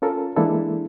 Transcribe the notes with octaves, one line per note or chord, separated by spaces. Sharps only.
C#4 F4 A4 A#4
E3 G#3 A#3 D4 E4 A4